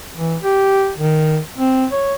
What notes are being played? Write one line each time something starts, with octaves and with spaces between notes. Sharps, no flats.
E3
G4
D#3
C4
C#5